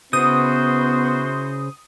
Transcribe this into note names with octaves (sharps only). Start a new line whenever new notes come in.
C#3 B3 E4 F#4 C5 D#6 G6